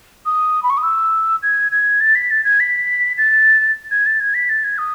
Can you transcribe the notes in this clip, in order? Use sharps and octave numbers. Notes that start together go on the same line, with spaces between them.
D#6
B5
C#6
D#6
E6
G#6
G#6
A6
B6
A6
G#6
B6
A6
G#6
A6
G#6
B6
A6
G#6
D#6